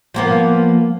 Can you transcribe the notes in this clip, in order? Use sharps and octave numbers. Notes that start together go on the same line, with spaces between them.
F3 A#3 B3